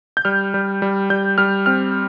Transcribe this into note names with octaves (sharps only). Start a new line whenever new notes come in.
G6
G3 F6
G3
G3
G3 G6
G3 F6
C4 F6